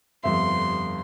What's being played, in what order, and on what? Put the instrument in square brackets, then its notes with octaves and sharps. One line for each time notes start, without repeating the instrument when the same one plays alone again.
[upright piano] G1 F2 E5 [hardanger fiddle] C6